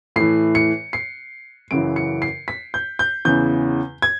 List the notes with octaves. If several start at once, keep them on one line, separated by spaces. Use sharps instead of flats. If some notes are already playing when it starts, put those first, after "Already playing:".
A2 E3 C7
C#7
C7
F#2 C#3 E3 D7
C#7
C7
B6
G6
G6
E2 C#3 E3 G6
G#6